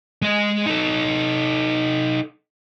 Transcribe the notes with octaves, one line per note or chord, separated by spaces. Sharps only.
G#3 D#5
D#4 A4